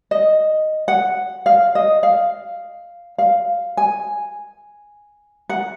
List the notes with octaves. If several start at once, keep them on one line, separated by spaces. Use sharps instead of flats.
D#5
F#5
F5
D#5
F5
F5
G#5
F#5